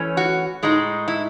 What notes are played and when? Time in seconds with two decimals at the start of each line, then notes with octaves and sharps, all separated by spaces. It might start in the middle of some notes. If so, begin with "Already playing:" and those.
Already playing: E3 A3 C#4
0.17 F#4
0.63 A2 G#3 D#4
1.08 E4